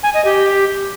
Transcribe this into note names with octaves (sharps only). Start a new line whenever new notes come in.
G#5
D#5
G4